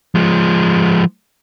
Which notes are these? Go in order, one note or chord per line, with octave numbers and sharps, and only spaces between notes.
F3 G#3